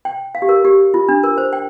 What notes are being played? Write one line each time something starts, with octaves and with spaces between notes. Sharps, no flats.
G5
F5
G4
A#4
G4
F4
D4
A#4
C5
G5